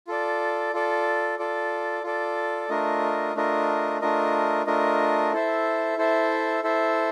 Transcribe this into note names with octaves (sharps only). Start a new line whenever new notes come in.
F4 A4 D5
F4 A4 D5
F4 A4 D5
F4 A4 D5
A3 D4 F4 A#4 D#5
A3 D4 F4 A#4 D#5
A3 D4 F4 A#4 D#5
A3 D4 F4 A#4 D#5
E4 A4 C5 E5
E4 A4 C5 E5
E4 A4 C5 E5